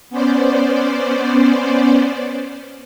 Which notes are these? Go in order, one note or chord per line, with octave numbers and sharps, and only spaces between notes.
B3 C#4 C5 D5